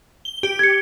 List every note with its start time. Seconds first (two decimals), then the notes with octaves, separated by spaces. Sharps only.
0.25 G7
0.43 G4
0.59 G#6 C#7